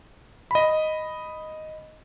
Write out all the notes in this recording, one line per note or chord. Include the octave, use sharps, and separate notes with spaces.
D#5 B5